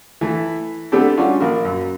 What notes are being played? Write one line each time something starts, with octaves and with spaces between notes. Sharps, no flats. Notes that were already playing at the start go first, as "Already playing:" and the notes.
E3 A3 E4
A3 B3 C4 D4 G4 A4
G3 C#4 D4 F4 F#4
A#1 A#4
F#2